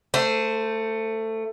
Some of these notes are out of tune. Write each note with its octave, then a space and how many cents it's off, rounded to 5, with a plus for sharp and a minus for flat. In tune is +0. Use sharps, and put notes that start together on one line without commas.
A3 +15 C5 -10